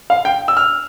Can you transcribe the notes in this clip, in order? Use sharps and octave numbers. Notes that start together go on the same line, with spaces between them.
F5
G5
E6
F6